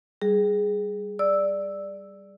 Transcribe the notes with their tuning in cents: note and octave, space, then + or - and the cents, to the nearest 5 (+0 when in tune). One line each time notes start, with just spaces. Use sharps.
G3 +0 G#4 +0
D5 +5 E6 +0